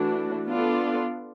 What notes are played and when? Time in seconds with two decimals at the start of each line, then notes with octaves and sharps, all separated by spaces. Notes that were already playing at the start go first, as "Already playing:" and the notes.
Already playing: E3 A3 D4 F#4
0.47 B3 D4 F4 A4 D5